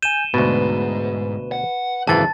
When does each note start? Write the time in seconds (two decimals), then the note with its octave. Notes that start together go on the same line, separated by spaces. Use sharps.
0.02 G#5 G6 D#7 E7 G7
0.34 D2 G#2 B2 B4
1.52 F#5
2.07 G#1 C#2 F#2 E3 A5 A6